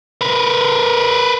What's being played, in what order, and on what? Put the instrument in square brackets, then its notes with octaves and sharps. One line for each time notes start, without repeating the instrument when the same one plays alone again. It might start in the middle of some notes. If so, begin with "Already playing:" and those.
[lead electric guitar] A#4 B4